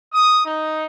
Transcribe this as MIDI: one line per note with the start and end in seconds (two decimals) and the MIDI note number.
0.13 0.43 87
0.45 0.85 63